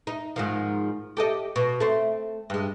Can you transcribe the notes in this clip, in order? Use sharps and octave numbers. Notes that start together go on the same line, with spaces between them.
D#4
G#2 D#3 F3
G4 A4 D#5
B2
A3 C4
G2 G#3